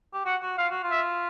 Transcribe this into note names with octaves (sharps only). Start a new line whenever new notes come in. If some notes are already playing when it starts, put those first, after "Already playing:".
G4
F#4 F#5
F#4
F4 F5
F#4
F4
E5